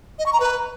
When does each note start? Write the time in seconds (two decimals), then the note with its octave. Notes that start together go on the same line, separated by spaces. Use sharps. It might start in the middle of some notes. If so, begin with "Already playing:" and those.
0.19 D#5
0.26 C#6
0.33 A#5
0.40 B4